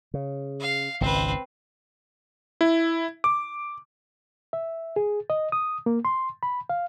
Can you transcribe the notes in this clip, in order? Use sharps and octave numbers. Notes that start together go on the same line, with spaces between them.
C#3
F5
G#1 C#2 C4 B4
E4
D6
E5
G#4
D#5
D#6
A#3
C6
B5
F5